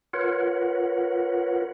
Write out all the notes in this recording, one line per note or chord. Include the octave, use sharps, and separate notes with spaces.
F4 A#4 B4 C#5 F#5